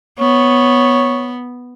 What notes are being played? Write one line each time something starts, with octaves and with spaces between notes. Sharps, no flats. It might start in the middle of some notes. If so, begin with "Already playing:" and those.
B3 C#5